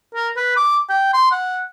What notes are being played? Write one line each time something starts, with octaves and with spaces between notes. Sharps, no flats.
A#4
B4
D6
G5
C6
F#5